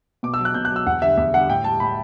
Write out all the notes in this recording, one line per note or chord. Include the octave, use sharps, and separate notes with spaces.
B2 D6
E6
F#3
F#6
B2 G6
F#6
F#3 E6
E2 F#5
D3 G3 E5
E2 E5
D3 G3 F#5
A2 G5
G3 A5
A2 B5